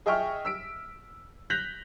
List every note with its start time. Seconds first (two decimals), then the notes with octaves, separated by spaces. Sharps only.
0.06 G#4 D#5 E5 G5 C#6 F6
0.45 E6 B6 D7
1.50 F#6 G6 A#6 B6 F7 F#7